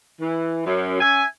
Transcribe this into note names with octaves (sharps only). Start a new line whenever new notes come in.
E3
F#2
C#4 E5 G#5